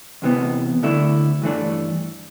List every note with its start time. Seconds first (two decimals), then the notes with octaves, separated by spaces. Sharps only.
0.22 E2 C3 E3 B3
0.83 D2 D3 A3 E4
1.42 G2 E3 A3 D4